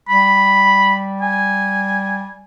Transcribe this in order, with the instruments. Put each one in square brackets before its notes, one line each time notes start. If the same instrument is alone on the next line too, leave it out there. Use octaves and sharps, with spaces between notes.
[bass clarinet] G3 [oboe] B5
[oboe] G#5